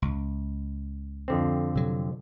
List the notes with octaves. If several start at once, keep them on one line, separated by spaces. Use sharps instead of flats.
C#2
F2 D3 C4
C3 F#3